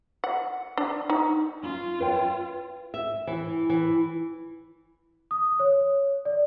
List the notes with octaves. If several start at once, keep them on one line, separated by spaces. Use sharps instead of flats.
F#5
D4
D#4
C#4 F4
B4 C#5 G5
E5
E3
E3
D#6
C#5
D5